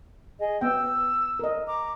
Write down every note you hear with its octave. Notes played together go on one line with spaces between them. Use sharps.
G#4 D#5
B3 G5 E6
A#4 D#5
A#5 D6